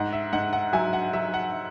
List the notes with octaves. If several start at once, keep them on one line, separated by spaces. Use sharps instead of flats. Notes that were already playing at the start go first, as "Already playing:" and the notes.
Already playing: G#2 F#5
E5
G#2 F#5
F#5
F#3 E5 G#5
F#5
F#3 E5
F#5